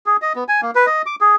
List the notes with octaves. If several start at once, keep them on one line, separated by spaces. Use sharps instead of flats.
G#4
D#5
B3
G#5
A#3
B4
D#5
D6
G#4